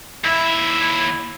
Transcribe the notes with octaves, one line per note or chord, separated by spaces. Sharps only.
D#2 E4 E5